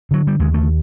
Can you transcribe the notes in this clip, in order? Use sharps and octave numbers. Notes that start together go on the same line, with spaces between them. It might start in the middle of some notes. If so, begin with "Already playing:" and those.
D3 F#3
G3
D#2 G#3
A3